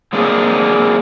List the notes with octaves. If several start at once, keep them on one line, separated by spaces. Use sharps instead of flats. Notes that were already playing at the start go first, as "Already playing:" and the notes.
F#3 G#3 A#3 C4 D4 G#4